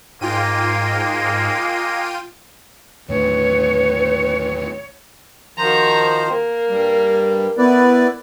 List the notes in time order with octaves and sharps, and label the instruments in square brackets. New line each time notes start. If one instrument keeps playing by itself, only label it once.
[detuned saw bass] G#2 [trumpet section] G#3 A#3 [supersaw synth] F4 G5 D#7
[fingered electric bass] D#2 A2 D3 [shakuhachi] B4 [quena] C#5
[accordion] D#3 F3 C5 [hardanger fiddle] F#4 A#5
[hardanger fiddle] A#3
[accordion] G2 G3
[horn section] B3 [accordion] E4 B4 D5